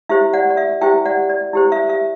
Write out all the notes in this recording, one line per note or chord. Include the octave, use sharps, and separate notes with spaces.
E4 G4 C5 E5
D5 F#5
D5
E5
E4 G4 C5 E5 G5
D5 F#5
D5
E4 G4 C5
E5
E5